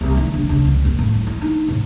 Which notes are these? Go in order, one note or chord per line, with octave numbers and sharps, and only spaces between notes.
C2
D#3
D3
C#3
C#2
A#2
A2
F#3
E4
D#4
A2